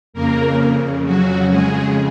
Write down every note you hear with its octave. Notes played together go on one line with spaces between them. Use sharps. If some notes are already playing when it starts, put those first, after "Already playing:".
F2 C#3 A#3 A#4
F#3 F#4
G#3 G#4